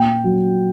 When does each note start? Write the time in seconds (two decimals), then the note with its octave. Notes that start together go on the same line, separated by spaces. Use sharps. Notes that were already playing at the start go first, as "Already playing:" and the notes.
Already playing: A#2 G5
0.24 F#3